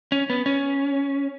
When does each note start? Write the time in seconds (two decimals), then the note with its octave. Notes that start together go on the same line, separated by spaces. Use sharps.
0.12 C#4
0.30 B3
0.46 C#4